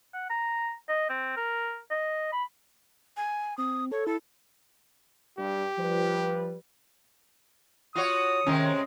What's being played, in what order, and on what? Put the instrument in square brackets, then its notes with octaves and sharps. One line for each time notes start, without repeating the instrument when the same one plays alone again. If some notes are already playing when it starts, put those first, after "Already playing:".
[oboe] F#5
A#5
D#5
C4
A#4
D#5
B5
[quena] G#5
[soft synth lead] C4 [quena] D#6
[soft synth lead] A4 [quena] C#5
[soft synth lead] E4 [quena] A4
[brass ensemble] G2 [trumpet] G4
[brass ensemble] F3 G3 B4
[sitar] F4 F#4 C#5 [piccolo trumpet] D#6
[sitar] C3 G#3 C4 [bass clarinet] D#3 [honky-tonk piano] C#4